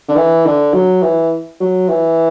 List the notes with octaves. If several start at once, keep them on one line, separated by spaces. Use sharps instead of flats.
D3
E3
D3
F#3
E3
F#3
E3